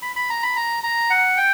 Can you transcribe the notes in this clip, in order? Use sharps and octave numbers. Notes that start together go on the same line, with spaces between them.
B5
B5
A#5
B5
A#5
A#5
F#5
G5